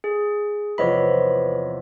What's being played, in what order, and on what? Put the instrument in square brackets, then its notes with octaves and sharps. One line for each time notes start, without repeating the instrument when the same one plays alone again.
[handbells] G#4
[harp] E2 C3 F3 [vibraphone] B4 [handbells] C#5 D#5 B5